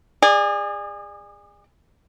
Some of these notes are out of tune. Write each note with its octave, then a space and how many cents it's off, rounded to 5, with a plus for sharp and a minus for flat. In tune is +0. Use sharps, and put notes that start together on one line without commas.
G#4 -30 D5 +25